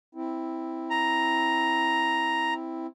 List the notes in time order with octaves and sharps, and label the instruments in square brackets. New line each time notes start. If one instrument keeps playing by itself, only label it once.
[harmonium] C4 E4
[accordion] A#5